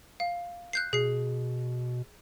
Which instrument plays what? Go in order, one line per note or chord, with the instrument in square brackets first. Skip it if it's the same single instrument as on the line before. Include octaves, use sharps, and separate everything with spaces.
[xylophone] F5
F#6 G6 C7
[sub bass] B2 [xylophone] G#4 C7